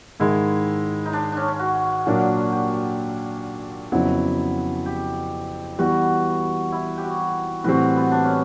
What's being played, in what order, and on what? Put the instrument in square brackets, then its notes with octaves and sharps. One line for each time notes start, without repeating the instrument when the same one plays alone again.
[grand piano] G#2 D#3 G#3 [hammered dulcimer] E4
[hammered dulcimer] D#4
D4
C#4 D4
C#4
F#4
[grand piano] A#2 F#3 A#3 D4
[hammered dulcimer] G4
[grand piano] F2 C#3 F#3 B3 E4
[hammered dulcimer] G4
[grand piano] E3 G3 B3 [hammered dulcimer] F#4
[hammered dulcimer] E4
G4
F#4
[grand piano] A2 E3 G3 C4 [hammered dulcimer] F#4
[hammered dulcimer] B3
D4
C#4